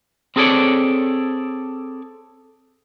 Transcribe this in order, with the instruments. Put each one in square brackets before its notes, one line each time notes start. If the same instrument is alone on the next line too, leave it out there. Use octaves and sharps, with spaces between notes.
[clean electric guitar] C4 G#4 A4 C#5 D5